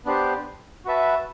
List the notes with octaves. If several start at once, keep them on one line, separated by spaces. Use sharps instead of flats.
B3 D4 G4 C5
F#4 B4 E5 A5